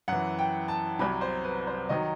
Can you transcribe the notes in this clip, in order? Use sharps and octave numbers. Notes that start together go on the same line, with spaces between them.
F#2 E3 F#5
G5
A5
C2 C3 F#3 B5
C5
B4
C5
D#3 F#3 D#5